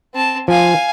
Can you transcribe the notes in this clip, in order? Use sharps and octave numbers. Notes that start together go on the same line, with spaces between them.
C4 A5
F3 F5 G#5